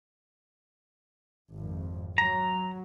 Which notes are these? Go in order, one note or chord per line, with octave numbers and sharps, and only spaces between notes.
G#1 F2
F#3 A#5